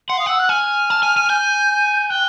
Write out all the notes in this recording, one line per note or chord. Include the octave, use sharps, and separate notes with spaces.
F#5 C6
F5 D#6
F#5 E6
F#6
G#5 F6
A5
G#5
G#5
G#5 G6
G5 F#6